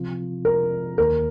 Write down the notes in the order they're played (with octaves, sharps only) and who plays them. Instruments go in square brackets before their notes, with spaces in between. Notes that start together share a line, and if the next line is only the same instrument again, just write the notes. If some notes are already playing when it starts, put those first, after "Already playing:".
Already playing: [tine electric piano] C3 F3 C4 F4
[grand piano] A#4
[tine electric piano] D#2 D#3 A#3 [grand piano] A#4